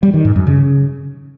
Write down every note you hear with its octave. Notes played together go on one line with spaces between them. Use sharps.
G3
D#3
G#2
F#2
C#3